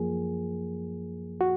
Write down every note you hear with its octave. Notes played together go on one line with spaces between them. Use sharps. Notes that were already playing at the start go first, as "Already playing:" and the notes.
Already playing: F#2 F3 A#3 G#4
F#4